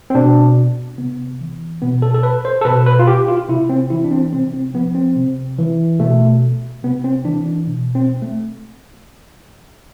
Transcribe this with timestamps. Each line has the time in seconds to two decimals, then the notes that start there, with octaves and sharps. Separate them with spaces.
0.10 C4
0.15 B2 D4
0.98 C3 B3
1.41 E3
1.82 B2 B3
2.02 A4
2.14 A4
2.23 B4
2.45 C5
2.61 A4
2.65 B2 B4
2.86 B4
2.99 F4
3.07 G4
3.28 F4
3.48 C3 E4
3.69 C4
3.90 E3 E4
4.04 D4
4.11 C4
4.33 C3 C4
4.53 C4
4.74 F3 B3
4.95 C4
5.16 C3
5.58 E3
5.99 B2 A3
6.83 C3 B3
7.04 C4
7.25 E3 D4
7.46 D4
7.67 B2
7.95 C4
8.22 A3